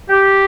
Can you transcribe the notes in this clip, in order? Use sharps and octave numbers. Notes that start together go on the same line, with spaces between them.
G4